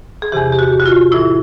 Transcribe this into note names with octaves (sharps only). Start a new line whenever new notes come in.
G#4
E2 C3 E3 G4
G4
F#4
F#4
F4
A2 E3 E4